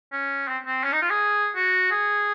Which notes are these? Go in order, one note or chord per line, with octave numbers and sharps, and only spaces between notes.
C#4
C4
C4
C#4
D#4
F4
G#4
F#4
G#4